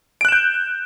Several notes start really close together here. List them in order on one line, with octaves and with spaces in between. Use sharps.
D7 F#6 E7 G6